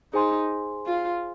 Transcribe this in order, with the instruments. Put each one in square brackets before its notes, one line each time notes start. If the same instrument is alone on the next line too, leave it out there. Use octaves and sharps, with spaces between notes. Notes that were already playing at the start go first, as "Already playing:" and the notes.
[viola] D#4 [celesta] G#4 C5 G#5 C6
[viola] F4